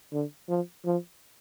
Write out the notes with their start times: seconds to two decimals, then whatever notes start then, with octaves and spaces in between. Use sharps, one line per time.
0.12 D3
0.49 F3
0.85 F3